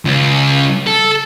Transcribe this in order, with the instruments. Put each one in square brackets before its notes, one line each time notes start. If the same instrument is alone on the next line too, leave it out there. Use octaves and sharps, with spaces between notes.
[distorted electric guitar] C#2
A4